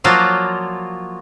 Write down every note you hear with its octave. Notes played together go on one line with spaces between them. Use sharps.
F3 F#3 A#3 F4 F#4 D5